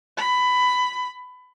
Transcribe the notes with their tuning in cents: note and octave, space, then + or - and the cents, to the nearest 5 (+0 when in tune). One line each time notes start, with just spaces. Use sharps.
B5 +15